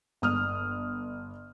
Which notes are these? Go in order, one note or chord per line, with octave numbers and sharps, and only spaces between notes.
G1 D#6 F6